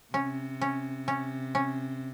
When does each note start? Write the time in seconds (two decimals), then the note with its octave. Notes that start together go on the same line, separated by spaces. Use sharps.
0.14 C3 C#4
0.61 C#4
1.08 C#4
1.55 C#4